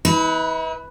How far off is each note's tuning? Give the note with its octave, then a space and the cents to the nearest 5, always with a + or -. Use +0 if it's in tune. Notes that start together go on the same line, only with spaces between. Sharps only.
E4 -45 B4 +0